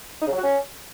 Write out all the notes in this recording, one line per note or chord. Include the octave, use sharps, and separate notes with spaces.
D#4
C#3
F#3
F#4
C#4